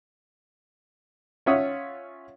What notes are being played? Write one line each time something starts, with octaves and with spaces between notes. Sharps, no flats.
C#4 F4 C#5 E5 F#5 D#6